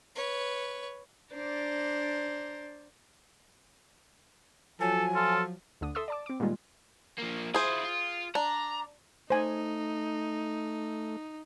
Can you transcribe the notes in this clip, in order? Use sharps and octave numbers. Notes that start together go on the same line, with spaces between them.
B4 C#5
D4 C5 D5 A#5
F3 F#3 A4 G#5
F4 A4
D2 D3 D#6
A4 E5 C6 D#6 E6
D5 A5 D6
C4 D6
A#2 D#3 G3 G#3 F4
F3 A#3
E4 F4 G#4 C5
F4
D4 A#5
A3 D#4 C5 G#5